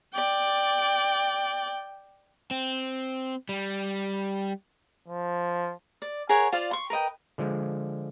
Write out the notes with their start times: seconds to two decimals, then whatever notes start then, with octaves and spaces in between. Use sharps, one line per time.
0.14 D5 G5
2.51 C4
3.49 G3
5.08 F3
6.02 D5
6.29 G#4 A#4 C#5 F#5
6.52 F4 C5 D5 F5
6.71 C6 C#6
6.90 A#4 B4 D#5 G5
7.38 D3 F3 G#3